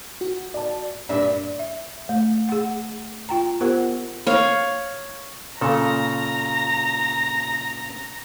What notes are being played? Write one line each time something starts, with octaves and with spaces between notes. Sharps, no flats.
F#4
D5 A5
G2 A#2 E5
E5
A3
G#4 F#5
F4 G5 A#5
B3 F4 G4 A#4 C5 F#5
C#5 F5
A#2 C#3 A4 A#5